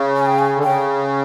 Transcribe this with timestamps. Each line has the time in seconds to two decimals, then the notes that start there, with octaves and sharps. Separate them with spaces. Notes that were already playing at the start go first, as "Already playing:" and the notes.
Already playing: C#3
0.16 G#5
0.27 G5
0.39 G#5
0.56 D3
0.63 C#3 G5